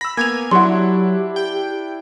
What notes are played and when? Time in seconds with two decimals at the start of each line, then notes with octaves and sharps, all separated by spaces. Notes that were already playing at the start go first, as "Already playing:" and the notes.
0.01 B5 E6 A#6
0.17 A#3 B3 G#5 G#6 F7
0.51 F#3 D4 E4 G4 F#5 C6
1.36 G5